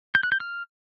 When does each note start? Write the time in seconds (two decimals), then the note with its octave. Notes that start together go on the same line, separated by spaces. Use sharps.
0.15 G6
0.23 F#6
0.32 G6
0.40 F6